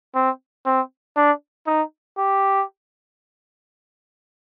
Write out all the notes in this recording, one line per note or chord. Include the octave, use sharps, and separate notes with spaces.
C4
C4
D4
D#4
G4